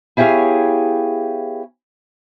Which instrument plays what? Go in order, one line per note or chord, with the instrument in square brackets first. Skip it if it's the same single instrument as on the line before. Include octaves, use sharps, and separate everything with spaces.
[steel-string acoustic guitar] B3 E4 G4 G#4 C#5 F5